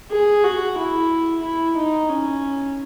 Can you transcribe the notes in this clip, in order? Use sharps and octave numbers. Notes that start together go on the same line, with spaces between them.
G#4
F#4
E4
E4
D#4
C#4